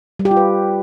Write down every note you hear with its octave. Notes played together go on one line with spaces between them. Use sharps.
G3
G4
F4
B4